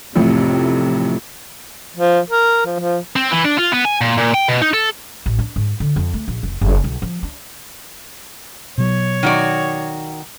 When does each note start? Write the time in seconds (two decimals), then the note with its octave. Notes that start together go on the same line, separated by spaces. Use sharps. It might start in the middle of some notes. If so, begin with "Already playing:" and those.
0.15 A1 F2 A2 C3
1.96 F3
2.30 A#4
2.66 F3
2.80 F3
3.16 C4
3.31 E3
3.45 D4
3.59 F4
3.74 B3
3.85 G#5
4.01 A#2
4.18 A#2
4.34 G5
4.48 B2
4.62 D#4
4.74 A4
5.26 A1
5.39 D4
5.56 G#2
5.80 D3
5.96 F2
6.13 A3
6.28 A#1
6.43 F1
6.61 F#1
6.84 B1
7.02 F3
7.23 D4
8.78 B2 F#3 C#5
9.23 D#3 F#4 D5